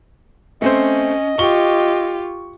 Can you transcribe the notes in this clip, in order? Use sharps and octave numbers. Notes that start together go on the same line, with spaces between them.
A3 C4 C#4 C5 D#5
F4 G4 C#6 G7